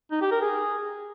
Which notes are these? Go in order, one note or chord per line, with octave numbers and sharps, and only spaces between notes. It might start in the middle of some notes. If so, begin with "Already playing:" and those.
D#4
G4
A#4
G#4